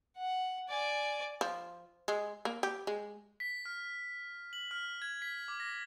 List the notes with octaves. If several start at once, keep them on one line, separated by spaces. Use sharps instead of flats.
F#5
D5 G#5
F3
G#3
A#3
G4
G#3
B6
F6
F#7
F6
G#6
B6
D6
A#6